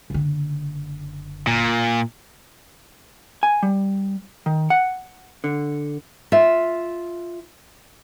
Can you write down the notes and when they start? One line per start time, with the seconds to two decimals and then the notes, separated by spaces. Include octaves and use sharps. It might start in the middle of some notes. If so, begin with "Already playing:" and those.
0.10 F#1 D3
1.47 A#2
3.43 G#5
3.63 G3
4.46 D#3
4.70 F#5
5.44 D3
6.32 F4 E5